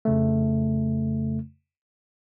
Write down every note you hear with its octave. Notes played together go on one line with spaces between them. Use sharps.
F2 C#3 A3